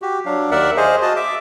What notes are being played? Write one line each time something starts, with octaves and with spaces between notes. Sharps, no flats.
F#4 G4
F#3 D4 F5
D#2 A#4 D5 E5 F#5
G#4 C5 D#5 F5
F#4 D#5 A5
E5 D6